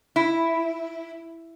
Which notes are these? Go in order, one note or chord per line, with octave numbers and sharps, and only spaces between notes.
E4